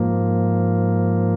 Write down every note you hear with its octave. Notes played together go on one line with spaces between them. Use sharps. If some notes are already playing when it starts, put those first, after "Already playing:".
Already playing: G#2 F3 A#3